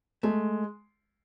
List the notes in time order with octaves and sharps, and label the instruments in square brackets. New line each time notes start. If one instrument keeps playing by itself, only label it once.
[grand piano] G#3 [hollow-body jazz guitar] A3